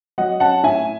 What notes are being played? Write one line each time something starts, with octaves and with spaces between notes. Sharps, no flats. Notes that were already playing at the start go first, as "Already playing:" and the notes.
F#3 D#5 F#5
C#4 F#5 A5
A2 E5 G#5